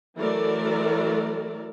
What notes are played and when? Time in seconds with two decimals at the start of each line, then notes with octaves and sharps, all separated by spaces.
0.17 E3 F#3 A3 A4 A#4 D5